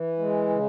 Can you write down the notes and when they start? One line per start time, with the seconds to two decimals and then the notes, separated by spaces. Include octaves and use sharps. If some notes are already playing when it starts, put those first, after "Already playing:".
Already playing: E3
0.19 G#3
0.49 C#3